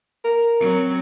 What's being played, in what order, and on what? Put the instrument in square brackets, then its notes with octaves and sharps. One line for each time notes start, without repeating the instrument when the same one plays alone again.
[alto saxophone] A#4
[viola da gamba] F#3 C4